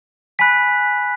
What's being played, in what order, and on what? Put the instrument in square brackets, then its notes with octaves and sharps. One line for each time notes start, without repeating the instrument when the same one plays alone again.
[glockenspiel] G#5 B5 F#6 B6